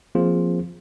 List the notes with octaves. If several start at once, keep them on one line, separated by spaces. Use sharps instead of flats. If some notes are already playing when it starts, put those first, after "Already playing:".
F3 A#3 C4 F4 G#4 C5